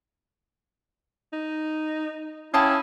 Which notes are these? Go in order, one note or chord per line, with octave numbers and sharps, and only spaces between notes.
D#4
C#4 E4 F5 G5 A5 D#6